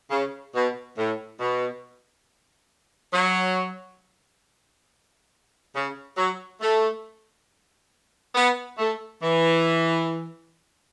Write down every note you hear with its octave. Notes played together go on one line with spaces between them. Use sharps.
C#3
B2
A2
B2
F#3
C#3
F#3
A3
B3
A3
E3